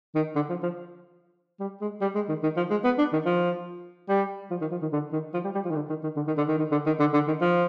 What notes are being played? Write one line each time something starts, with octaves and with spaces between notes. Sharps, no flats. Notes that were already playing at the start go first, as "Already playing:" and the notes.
D#3
D3
F3
F3
G3
G#3
G3
G#3
D#3
D#3
F3
G#3
B3
D4
D#3
F3
G3
F3
D#3
F3
D#3
D3
D#3
F3
G3
G3
F3
D#3
D3
D#3
D#3
D3
D#3
D3
D#3
D#3
D3
D#3
D3
D3
D#3
F3